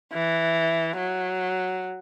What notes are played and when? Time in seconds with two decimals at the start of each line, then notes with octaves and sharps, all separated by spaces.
0.13 E3
0.97 F#3